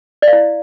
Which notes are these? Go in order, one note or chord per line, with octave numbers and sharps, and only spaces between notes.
D5
F5
E4